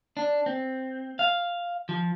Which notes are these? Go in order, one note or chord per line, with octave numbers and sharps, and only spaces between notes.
D4
C4
F5
F3